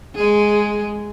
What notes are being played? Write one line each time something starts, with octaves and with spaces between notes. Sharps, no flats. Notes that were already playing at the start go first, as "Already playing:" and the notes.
G#3 G#4